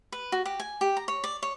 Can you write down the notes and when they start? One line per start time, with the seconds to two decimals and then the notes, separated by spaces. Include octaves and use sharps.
0.12 B4
0.32 F#4
0.46 G4
0.60 G#5
0.81 G4
0.97 A#5
1.08 C#5
1.24 D5
1.43 C#5